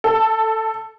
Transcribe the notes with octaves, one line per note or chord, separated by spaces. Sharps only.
A4